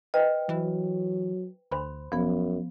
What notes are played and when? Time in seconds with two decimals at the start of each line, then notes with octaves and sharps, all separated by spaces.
0.14 B4 C5 D#5 G5
0.49 E3 F#3
1.71 D2 C5 B5 C6
2.12 E1 F#2 F3 B3